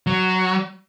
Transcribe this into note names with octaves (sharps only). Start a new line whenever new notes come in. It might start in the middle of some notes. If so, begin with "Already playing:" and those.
F#3